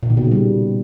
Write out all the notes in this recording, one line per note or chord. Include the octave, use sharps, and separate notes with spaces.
A#2
D#3
B2
C#3
G3